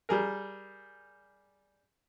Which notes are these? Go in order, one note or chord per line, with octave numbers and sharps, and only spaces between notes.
G3 G#4 A#4